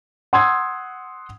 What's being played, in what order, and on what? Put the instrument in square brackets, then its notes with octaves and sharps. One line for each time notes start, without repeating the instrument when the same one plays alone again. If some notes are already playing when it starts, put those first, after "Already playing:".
[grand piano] F#5 C6 D#6 E6 G#6